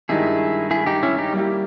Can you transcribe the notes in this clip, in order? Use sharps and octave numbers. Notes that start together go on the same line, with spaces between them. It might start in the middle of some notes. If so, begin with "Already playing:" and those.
G2 D#3 G#3 D#4 E4 G4 G#4
E4 G#4
D#4 G4
C#4 E4
D#4 G4
G3 A#3 E4 G4